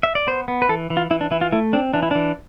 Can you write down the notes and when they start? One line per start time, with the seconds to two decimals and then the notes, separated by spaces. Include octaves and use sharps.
0.03 E5
0.15 D5
0.27 B3 C5
0.48 B3
0.62 B4
0.69 E3 A4
0.90 E3
0.97 F4
1.11 E3 E4
1.21 D4
1.31 E3 E4
1.41 F4
1.52 A3 E4
1.73 C4 D4
1.94 E3 D4
2.03 E4
2.11 E3 D4